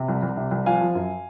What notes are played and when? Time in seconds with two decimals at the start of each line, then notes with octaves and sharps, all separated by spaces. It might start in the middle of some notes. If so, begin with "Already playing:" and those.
Already playing: C3
0.08 C2
0.22 C2
0.37 C3
0.51 C2
0.66 F3 F5 G#5
0.81 F3
0.95 F#2